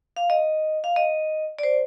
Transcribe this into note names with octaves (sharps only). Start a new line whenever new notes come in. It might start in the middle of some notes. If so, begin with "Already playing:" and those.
F5
D#5
F5
D#5
D5
C5